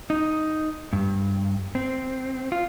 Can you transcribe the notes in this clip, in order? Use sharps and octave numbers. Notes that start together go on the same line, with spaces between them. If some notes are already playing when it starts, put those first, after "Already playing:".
D#4
G2
C4
F4